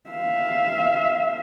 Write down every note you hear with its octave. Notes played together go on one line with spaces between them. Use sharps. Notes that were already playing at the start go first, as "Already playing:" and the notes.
E5 F5